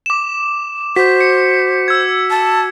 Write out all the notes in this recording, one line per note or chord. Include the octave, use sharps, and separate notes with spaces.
D6 E7
F#4 C5 B6
C#7
E6 G#6
A5